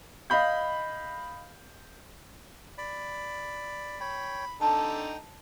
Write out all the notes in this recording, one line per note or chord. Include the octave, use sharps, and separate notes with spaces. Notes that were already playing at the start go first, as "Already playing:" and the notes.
D#5 F5 B5 G6
D5 B5
C#5 G5 B5
D3 D#4 A4 G5 A5